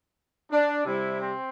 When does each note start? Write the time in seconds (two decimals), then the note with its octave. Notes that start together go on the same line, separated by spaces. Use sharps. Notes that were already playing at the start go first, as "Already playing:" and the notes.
0.52 D4
0.85 C3 G3 E4
1.20 C4